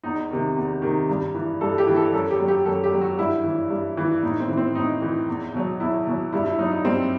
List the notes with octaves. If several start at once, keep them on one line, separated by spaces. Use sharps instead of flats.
E2 D#4
C3 D#3
E2
C3 D#3
G2
E3
G2 A4
A4
G4
E3
A4
F#2 A4
G4
F#3
G4
F#2 A4
G4
F#3
F#4
G2 E4
E3
G2
E3
A2 D#4
C4
E3
C4
A2 D#4
E3
E2
B2 F#3
E2 E4
B2 F#3
G2 E4
E4
F#3 D#4
D#4
G2 C4